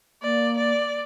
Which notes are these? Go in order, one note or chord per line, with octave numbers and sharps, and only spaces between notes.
A#3 D5
D5